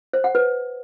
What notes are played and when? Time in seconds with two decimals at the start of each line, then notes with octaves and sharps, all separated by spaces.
0.13 C5
0.24 F#5
0.35 B4